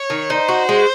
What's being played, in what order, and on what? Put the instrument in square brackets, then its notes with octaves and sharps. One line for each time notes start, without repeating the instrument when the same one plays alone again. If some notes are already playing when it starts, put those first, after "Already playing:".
Already playing: [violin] C#5
[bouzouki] D#3
[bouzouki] D#4 [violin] C5
[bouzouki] F#4
G#3